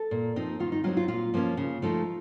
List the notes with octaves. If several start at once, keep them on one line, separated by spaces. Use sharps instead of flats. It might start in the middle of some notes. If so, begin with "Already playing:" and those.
Already playing: A4
A#2
F3 C4 D#4
D#3 F4
D#4
F#3 C4 D#4 F4
F4
A#2 F4
F3 A#3 C#4
C#3
F3 A3 D#4